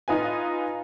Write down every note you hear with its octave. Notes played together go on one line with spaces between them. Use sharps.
D#4 F4 B4 G#5